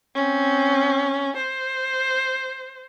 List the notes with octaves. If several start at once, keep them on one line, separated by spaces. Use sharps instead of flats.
C4 C#4
C5